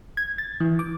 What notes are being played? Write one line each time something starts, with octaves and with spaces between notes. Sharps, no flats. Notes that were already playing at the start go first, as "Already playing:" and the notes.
G#6
A6
E3
D6